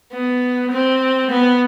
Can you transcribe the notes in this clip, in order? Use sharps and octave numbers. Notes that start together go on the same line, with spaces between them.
B3
C4
B3